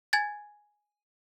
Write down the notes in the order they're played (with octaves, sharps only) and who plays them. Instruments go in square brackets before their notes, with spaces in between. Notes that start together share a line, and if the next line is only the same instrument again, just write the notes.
[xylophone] G#5 G#6 A6